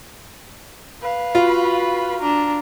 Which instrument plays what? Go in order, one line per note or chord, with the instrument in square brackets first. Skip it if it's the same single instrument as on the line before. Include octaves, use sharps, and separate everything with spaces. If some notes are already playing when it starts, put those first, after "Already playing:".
[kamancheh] B4 F5
[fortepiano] F4 [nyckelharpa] F#4 B5
[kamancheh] D4 [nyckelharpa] A#5